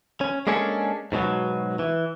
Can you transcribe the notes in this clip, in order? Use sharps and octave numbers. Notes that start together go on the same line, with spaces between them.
C#4
G#3 A#3 C#4 D4 G#4 A4
G#2 B2 E3 F#3
E3